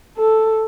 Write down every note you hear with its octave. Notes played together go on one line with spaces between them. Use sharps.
A4